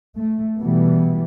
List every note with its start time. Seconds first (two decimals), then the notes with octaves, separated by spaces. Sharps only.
0.17 A3
0.58 B2 E3 G3 A3 B3